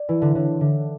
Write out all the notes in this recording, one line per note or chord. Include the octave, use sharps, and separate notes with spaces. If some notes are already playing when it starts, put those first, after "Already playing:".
Already playing: D5
E3 E4
D3
D3 C#5
D3 E5